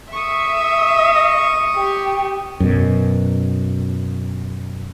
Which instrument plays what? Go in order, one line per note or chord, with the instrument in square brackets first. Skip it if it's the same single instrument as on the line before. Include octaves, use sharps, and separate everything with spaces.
[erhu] E5 [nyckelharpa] C#6 D#6
[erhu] G4
[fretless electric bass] F#2 B2